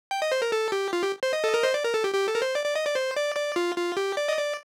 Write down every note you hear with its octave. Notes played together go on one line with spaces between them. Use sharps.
G5
D#5
C5
A#4
A4
G4
F4
G4
C5
D#5
A4
A#4
C5
D5
A#4
A4
G4
G4
A4
A#4
C5
D5
D5
D#5
D5
C5
D5
D5
F4
F4
G4
D5
D#5
D5